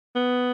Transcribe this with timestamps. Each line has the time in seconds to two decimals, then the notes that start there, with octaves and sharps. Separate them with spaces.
0.15 B3